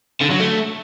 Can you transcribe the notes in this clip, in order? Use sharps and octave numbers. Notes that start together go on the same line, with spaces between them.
D3
F#3
A3